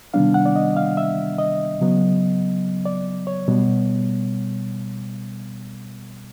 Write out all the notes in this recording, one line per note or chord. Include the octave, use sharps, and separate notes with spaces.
C3 D#3 G3 B3 D4 F5
F#5
D5
D#5
F5
E5
D#5
C#3 F#3 B3
D5
C#5
B2 G3 B3